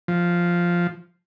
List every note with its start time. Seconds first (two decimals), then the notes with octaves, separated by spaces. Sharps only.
0.08 F3